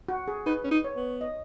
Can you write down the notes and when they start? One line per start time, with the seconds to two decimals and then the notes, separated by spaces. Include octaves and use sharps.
0.08 F#4
0.28 G#4
0.46 D#4 B4
0.64 C#4
0.71 D#4
0.84 C#5
0.96 B3
1.21 D#5